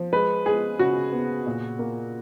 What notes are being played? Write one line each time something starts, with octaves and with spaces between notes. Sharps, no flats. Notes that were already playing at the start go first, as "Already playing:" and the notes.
Already playing: F3
G#3 B4
G#3 G#4
C#3 F#4
B3
A#2
A#3